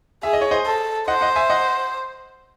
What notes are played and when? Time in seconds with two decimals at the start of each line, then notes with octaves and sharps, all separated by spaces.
0.23 G#4 E5
0.33 D#5
0.41 C#5
0.51 C5 D#5
0.66 A4
1.08 C5 D#5 F#5
1.21 D#5 F#5
1.36 E5 G#5
1.50 D#5 F#5